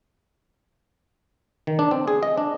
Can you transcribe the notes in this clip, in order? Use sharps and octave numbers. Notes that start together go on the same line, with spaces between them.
D#3
D4
C4
G#4
D#5
D4